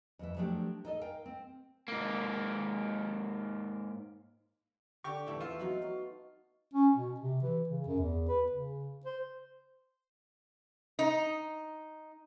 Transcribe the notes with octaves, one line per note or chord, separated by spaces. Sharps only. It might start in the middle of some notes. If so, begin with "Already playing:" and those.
F2 E3 E5
F3 F#3 A3 D4 G4
D#4 A4 D#5
A#4 F5 G5
C4
G#2 A#3
D3 G4 C#6
E2 E3 A3
C4 F4 E5
F#3 B3 D#4
F#4
C#4
B2
C3
E3
C#3
F#2
E2
B4
C#3
C5
D#4